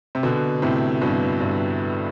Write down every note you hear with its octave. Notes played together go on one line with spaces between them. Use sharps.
C3
B2 D3
A2 C3
G2 B2
G2